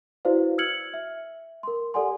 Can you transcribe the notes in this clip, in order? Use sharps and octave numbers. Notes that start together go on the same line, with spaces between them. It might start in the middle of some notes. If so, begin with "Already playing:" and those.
E4 F#4 B4 C5 D5 F5
E6 F6 G#6 C#7 F#7
E5
A#4 C6
G4 A4 D5 F#5 G#5 C6